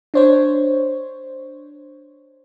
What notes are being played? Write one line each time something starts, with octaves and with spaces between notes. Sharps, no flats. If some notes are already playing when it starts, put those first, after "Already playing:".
D4 C5 C#5